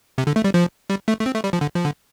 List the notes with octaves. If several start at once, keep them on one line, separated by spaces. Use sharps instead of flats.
C3
D3
A3
G3
F3
G3
A3
A3
C4
A3
G3
F3
D3
F3
D3